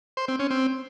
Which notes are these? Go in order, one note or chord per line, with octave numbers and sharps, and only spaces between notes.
C5
C4
C#4
C4